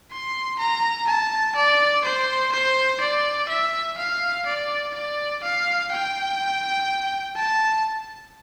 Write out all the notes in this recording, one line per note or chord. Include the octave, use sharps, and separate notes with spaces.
C6
A#5
A5
D5
C5
C5
D5
E5
F5
D5
D5
F5
G5
A5